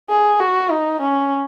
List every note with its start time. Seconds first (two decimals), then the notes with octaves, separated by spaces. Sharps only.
0.09 G#4
0.40 F#4
0.71 D#4
1.01 C#4